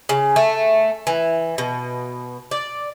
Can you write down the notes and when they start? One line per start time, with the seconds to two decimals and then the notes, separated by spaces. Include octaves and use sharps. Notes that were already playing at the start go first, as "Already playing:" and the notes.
0.09 C#3
0.36 A3
1.07 E3
1.58 B2
2.51 D5